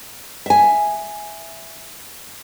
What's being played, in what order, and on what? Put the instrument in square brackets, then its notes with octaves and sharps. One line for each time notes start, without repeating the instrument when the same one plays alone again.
[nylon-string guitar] E5 G#5